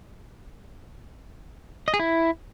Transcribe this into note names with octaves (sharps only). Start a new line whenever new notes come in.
D#5
G#4
E4